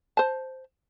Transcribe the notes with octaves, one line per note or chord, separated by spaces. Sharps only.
C5 A5